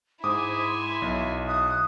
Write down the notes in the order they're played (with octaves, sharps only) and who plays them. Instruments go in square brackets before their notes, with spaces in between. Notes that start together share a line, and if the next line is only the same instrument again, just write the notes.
[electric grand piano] G#2 D6 D#6 [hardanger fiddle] E4 G#5 [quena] C5
[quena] C6
[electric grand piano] B1 [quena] E5
[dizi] D#6 [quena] F#6